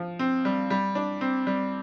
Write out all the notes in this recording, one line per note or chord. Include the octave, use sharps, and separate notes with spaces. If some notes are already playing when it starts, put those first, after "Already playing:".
Already playing: F3
C4
G3
G3
D4
C4
G3